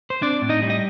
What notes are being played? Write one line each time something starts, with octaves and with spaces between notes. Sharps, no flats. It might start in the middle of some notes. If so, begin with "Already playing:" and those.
C5
C4 D4 D5
A2
D#4 D#5
G3
D#5